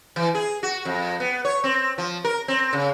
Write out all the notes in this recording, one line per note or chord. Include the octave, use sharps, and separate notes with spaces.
E3
G#4
F#4
F2
B3
C#5
C4
F3
A#4
C4
C#3